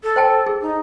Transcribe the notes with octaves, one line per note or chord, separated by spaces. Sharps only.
A4
C5 G5 A5
G#4
D#4